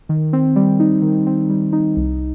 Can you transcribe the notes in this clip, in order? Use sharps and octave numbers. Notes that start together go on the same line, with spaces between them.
D#3
C4
G3
D#4
D#3
C4
G3
D#4
C2